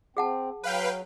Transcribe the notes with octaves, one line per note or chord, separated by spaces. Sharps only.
C4 G#4 F#5 A5
F#3 B4 F5 G5